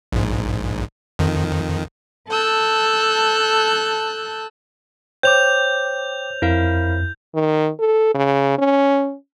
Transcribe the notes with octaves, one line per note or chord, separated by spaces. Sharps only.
A#1 G#2
F2 D#3
A4 A5 E6 F#6 G6
C5 C#5 G5 D6 G6 F7
F2 E4 A#4 F5
D#3
A4
C#3
C#4